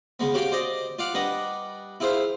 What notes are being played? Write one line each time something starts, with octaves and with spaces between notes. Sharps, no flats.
C#3 G#3 B3
C#4 F#4 G4 C#5 F5 G5
C5 D5 D#5
F4 D5 F5 F#5
G3 D4 B4 D#5 F#5
E4 F4 G#4 C5 E5 F5